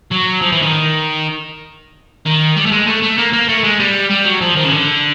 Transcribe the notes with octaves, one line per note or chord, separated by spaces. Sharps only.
F#3
F3
E3
D#3
D#3
G3
A3
G#3
A3
A3
A#3
A#3
A3
G#3
G3
G3
F#3
F3
D#3
C#3
D3